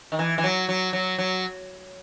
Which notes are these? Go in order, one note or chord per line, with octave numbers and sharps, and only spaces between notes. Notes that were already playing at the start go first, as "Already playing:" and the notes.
D#3
E3
E3
F#3
F#3
F#3
F#3